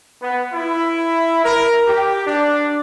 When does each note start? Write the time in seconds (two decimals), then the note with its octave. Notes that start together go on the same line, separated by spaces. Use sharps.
0.21 B3
0.53 E4
1.44 A#4
1.87 G4
2.26 D4